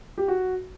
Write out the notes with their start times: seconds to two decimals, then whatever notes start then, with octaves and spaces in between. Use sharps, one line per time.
0.18 G4
0.28 F#4